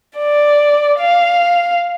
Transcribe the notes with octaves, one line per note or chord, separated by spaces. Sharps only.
D5
F5